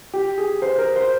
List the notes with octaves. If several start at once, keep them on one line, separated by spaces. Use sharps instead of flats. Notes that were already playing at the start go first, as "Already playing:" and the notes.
G4
G#4
C5
A#4
C5